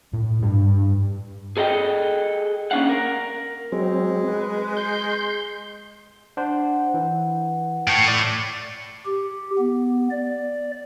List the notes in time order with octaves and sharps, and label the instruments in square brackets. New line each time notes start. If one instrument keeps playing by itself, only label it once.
[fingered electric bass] A2
G2 D4
[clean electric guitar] G#4 A4 D#5 F#5 G5
A#3 C#4 D4 F5 F#5
A#4
[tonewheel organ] F#3 C4 [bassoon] G#3
[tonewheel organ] B4
C6 G6
[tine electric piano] D4 C5 [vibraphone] F#5
[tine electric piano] E3
[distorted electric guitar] A2 C#5 [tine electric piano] G5 A5
[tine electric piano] D5
[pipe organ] G4
B3
D5